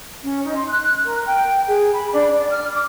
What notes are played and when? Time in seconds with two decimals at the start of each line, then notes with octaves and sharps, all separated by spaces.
0.22 C#4
0.45 D#4
0.56 C6
0.68 F#6
1.05 A#4
1.26 G5
1.67 G#4
1.93 B5
2.13 D4
2.36 D5
2.50 F6
2.71 D6